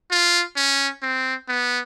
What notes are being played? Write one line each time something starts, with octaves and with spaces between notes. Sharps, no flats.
F4
C#4
C4
B3